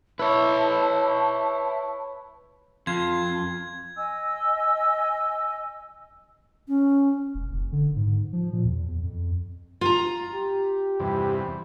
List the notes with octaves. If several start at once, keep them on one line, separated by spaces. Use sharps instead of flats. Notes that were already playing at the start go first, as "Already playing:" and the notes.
E4 B4 C#5 A5
F2 F4 G#6
D#5 G#5 E6
C#4
E1
F#1
D3
G#2
F3
A#2
E2
F2
F4 A#5
G4
E2 G2 C3